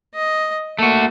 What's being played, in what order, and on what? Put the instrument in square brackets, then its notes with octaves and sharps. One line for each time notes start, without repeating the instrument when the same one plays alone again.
[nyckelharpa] D#5
[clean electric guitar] A3 F#4 [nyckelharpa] A#3